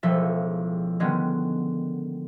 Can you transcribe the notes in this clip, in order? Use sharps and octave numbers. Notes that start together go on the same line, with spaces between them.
E1 C#2 F3 A4 E5
D3 D#3 G3 G#3 B3 C#4